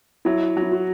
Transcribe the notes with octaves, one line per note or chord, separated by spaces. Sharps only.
F#3 E4
F#3
E4
F#4